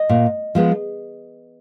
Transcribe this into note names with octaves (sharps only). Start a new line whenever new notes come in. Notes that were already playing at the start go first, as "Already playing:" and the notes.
Already playing: D#5
A#2
F3 G#3 B3